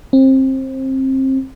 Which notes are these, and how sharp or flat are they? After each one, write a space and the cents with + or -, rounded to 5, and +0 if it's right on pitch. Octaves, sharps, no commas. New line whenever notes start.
C4 +25